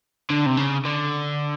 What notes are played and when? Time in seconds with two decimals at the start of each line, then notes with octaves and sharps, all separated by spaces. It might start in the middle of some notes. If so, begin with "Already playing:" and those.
0.30 D3
0.46 C3
0.57 C#3
0.85 D3